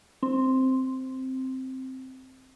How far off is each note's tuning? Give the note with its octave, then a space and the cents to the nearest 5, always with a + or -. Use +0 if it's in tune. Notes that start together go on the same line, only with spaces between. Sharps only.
C4 +0